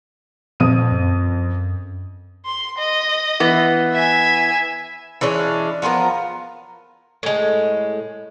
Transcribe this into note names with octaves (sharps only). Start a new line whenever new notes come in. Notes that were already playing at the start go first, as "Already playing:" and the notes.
F2 A#2 D#6 D#7
F#2
C6
D#5
E3 B3
E5 G#5
E3 G#3 C#4 D4
F3 B3 F4 A#4
A2 G#3